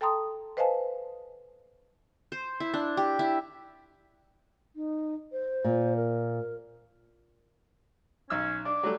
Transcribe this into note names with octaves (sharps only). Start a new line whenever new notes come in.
A4 G5 A5 A#5 C6 D#6
B4 C5 D#5 F5 G#5 A5
C5
E4
D4
G4
E4
D#4
C5
A#2
A#4
B1 C#4 E6
D4 D6
F#3 G3 A3